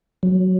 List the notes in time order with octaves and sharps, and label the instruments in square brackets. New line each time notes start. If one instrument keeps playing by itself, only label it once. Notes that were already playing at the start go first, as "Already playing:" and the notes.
[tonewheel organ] F#3